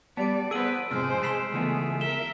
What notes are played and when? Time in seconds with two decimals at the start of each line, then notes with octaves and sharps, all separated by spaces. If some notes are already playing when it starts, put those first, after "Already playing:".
0.17 G3 B3 D5 A5 D7
0.51 B3 G#4 B4 C5 E6 D7 F#7
0.91 F2 G#2 C3 G#3 C5 E6 F6 D7
1.23 A5 B5 C6 B6 C7 E7
1.52 C#2 E3 G#3 A3 B3
2.01 A#4 E5 E7 G7